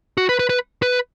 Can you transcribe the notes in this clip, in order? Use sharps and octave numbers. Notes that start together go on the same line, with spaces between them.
F#4
B4
B4
B4
B4